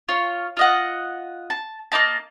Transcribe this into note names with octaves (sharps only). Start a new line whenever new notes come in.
F4 C#5
F4 D#5 F#5
A5
A#3 C4 D#4 A5